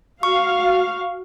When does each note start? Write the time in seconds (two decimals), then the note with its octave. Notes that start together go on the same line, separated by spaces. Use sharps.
0.23 F#4 F5 C#6